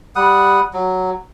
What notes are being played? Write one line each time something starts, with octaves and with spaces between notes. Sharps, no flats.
G3 F#5 D#6
F#3